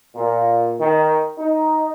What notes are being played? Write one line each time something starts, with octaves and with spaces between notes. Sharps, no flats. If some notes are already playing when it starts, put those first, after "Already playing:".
A#2
D#3
D#4